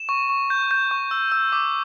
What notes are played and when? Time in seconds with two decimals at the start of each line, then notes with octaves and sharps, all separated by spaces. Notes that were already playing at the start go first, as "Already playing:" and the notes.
Already playing: E7
0.09 C#6
0.29 C#6
0.50 G6
0.71 G6
0.91 C#6
1.11 E6
1.32 E6
1.52 D6